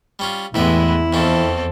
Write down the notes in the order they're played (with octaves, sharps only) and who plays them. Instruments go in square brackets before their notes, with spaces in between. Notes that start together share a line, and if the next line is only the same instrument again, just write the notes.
[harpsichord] G3 C#4 F4
[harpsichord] A1 G4 E5 [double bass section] E2 [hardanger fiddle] G#3 B3 [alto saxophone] E4
[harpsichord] F2 C#4 [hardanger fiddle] C4 A4